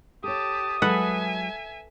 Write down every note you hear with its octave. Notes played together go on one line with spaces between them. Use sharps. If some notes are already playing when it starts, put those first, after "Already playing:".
G4 A4 C#5 A5 D#6
F#3 G#3 A4 B4 E5 F#5 G#5